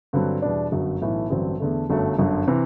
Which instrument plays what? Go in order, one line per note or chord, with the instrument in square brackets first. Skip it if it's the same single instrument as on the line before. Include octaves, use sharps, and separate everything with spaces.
[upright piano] G2 D3 F#3 C4
E2 B2 G3 D4
G1 F#2 F#3
B1 A2 E3
A1 G2 D3 F#3 C4
E2 D3 A3
G1 F#2 F#3 A3
G1 F#2 D3
C3 E3